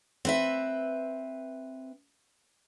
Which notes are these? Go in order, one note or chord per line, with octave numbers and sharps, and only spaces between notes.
C4 B4 E5